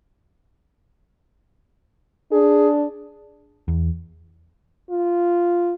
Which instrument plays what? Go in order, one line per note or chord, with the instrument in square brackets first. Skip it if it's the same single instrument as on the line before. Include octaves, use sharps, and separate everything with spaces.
[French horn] D4 [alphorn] G#4
[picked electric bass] E2
[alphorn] F4